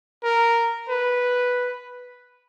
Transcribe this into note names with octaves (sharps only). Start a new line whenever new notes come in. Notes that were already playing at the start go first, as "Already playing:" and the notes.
A#4
B4